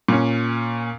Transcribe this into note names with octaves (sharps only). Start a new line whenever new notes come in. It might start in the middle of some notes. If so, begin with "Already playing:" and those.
A#2 C#4